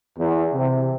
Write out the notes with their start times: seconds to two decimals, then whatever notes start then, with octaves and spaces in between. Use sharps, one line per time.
0.18 E2
0.53 C3